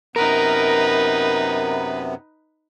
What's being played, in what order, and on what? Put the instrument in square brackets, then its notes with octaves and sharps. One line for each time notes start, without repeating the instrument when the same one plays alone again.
[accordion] F#2 C3 B3 [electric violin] D#4 B4 [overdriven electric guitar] A#4